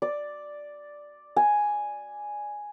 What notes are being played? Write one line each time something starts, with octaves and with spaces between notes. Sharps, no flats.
D5
G#5